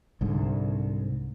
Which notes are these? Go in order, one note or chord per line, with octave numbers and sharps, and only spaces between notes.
C2 G#2 D3